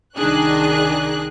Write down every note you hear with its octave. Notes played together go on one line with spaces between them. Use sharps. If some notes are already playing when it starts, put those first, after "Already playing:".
C2 D#3 D4 G#4 F#6